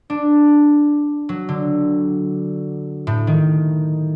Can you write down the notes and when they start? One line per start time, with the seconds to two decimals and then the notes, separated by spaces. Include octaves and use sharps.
0.10 D4
1.29 F#3
1.49 D3
3.07 A2
3.27 D#3